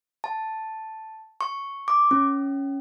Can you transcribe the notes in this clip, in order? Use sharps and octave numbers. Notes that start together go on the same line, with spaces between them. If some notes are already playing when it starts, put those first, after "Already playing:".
A5
C#6
D6
C#4